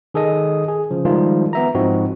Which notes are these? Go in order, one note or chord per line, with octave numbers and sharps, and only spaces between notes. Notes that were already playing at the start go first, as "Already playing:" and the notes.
D#3 G#4 A4 D#5 D#6
G#4
C#3 F3
D#3 F3 G3 G#3 D#4 F4
B3 E5 A#5
G#2 F3 C4 D#4 F#4